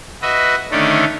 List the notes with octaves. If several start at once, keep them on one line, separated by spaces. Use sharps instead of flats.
F#4 B4 D#5 E5
D3 D#3 A3 C#4 D4 A4